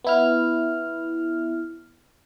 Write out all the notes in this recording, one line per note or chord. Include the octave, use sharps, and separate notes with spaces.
B3 E4 F6